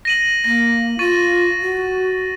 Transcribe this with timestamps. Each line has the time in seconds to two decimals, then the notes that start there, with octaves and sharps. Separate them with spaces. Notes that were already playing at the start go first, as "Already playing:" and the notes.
0.05 A#6 D#7 F#7
0.44 A#3 A#6
0.99 F4 C#6 A6 D#7
1.61 F#4